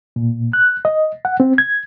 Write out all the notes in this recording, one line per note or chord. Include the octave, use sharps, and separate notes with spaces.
A#2
F#6
D#5
F#5
C4
G#6